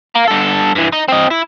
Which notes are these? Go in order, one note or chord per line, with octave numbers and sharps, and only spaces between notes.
F5 A#5
G2 A4
G2 E3
D#4
C4 D#5
E4